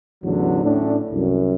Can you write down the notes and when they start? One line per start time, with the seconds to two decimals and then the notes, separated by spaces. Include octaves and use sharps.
0.23 A1 E2 D3 F#3
0.64 A2 C#4 D4
1.11 C2 F#2